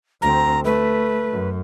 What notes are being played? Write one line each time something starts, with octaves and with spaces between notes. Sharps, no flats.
D2 C4 A#5
A3 B4
F#2